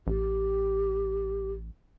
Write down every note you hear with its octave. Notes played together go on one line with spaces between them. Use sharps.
A1 G4